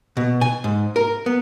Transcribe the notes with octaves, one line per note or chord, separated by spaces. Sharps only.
B2
G#5
G#2
A#4
B3